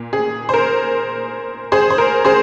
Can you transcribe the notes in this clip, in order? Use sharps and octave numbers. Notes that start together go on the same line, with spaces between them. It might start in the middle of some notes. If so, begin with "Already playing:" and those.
Already playing: A#2
G#4
C5
A#4
G#4 C5
C5
A#4
G#4 C5